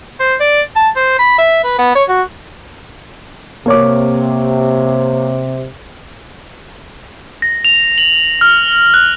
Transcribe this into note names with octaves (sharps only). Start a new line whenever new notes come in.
C5
D5
A5
C5
B5
E5
B4
B3
C#5
F#4
C3 A#3 C#5 D6
A#6
F7
F#7
F6
F#6